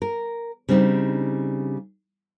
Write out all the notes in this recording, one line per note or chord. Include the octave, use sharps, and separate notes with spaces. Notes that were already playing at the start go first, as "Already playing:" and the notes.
A#4
C#3 G3 C4 D4 D#4